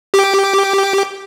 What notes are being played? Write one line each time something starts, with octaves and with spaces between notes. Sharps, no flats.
G4 D6